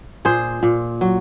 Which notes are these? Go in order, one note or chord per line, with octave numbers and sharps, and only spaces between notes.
A#2 G#4 C5
A#2
F#3